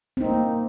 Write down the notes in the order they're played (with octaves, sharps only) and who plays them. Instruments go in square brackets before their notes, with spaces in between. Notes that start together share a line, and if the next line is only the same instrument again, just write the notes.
[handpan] C4
D#4
A#3